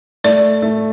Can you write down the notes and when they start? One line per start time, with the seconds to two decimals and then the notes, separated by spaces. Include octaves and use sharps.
0.24 A3 D5
0.62 A3